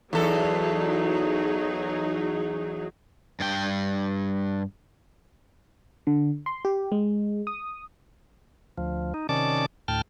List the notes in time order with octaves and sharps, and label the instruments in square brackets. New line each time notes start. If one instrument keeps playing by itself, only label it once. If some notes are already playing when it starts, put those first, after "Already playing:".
[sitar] E2 A4 [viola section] F#3 D#4 G#4
[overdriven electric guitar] G2 G5
[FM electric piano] D3
C6
G4
G#3
D#6
[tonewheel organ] D2 F3
D#4
C3 D#3 C#4 D5 A5 D6
D2 A2 G5 A5 F6